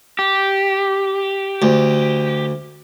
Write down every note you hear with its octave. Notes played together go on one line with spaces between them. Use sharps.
G4
D2